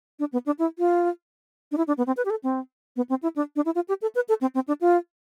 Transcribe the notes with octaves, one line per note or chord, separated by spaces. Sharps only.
D4
B3
D4
E4
F4
D4
E4
D4
B3
C4
B4
G4
A4
C4
B3
C4
E4
D4
D4
E4
F4
G4
A4
B4
A4
C4
C4
D4
F4